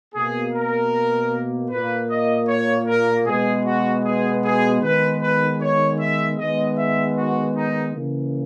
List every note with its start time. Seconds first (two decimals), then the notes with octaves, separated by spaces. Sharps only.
0.14 B2 A#3 G#4
0.53 A#4
1.70 A#2 A#3 B4
2.10 D#5
2.48 C#5
2.87 A#4
3.26 B2 G#3 B3 G#4
3.65 F#4
4.04 G#4
4.43 G#4
4.82 D#3 G#3 B3 B4
5.21 B4
5.60 C#5
5.99 E5
6.37 D#3 G#3 B3 D#5
6.77 E5
7.16 F#4
7.55 D#4
7.93 C#3 E3 A#3